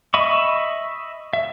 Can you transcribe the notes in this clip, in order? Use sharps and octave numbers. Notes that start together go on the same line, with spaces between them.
D#5 E5 B5 C#6
E5